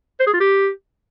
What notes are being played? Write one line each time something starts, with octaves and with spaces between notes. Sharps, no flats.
C5
G#4
F4
G4